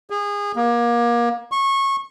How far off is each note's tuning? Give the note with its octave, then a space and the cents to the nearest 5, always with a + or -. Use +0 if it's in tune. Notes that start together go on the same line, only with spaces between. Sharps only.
G#4 -25
A#3 +30
C#6 -20